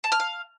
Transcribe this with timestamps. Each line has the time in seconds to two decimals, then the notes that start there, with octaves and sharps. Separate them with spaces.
0.04 A5
0.12 F6
0.20 F5